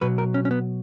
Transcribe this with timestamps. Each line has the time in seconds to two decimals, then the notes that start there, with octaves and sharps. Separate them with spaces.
0.01 B2 F#3 B4
0.18 A#4
0.34 C#4
0.45 C#4
0.51 B3